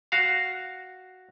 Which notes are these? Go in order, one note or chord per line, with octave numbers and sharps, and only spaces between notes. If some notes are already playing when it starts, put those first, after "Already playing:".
F#4 F5